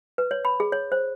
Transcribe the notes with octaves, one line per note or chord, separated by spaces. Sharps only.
B4
C#5
B5
G#4
C#5
C5